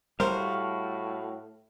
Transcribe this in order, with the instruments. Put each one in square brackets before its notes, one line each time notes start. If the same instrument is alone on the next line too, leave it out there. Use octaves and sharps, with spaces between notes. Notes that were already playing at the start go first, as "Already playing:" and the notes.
[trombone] A2 [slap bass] G3 [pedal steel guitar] F#4 F5 [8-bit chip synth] A#4 C5